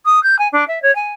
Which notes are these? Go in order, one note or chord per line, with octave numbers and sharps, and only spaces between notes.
D#6
G6
G#5
D4
E5
C#5
G#5